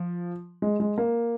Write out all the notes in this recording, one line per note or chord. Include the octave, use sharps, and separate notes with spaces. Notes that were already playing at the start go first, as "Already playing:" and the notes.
Already playing: F3
G#3
G#3
A#3